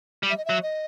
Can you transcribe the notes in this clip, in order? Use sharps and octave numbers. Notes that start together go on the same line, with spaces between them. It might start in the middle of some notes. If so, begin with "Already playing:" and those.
G3
E5
D#5
F#3 E5
D#5